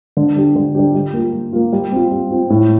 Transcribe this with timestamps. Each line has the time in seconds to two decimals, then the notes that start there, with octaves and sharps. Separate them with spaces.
0.17 D3
0.36 G3 D4 G4
0.56 D3
0.75 G3 D4 G4
0.94 G3
1.14 A#3 F4
1.33 G3
1.53 A#3 F4
1.73 G3
1.92 C4 F4
2.11 G3
2.31 C4 F4
2.50 A2